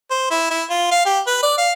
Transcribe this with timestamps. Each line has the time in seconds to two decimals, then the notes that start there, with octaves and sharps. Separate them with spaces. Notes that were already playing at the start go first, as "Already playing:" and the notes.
0.11 C5
0.30 E4
0.51 E4
0.70 F4
0.91 F5
1.05 G4
1.27 B4
1.42 D5
1.58 F5